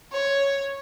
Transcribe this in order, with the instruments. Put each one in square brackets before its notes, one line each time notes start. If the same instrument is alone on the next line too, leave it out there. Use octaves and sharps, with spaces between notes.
[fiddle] C#5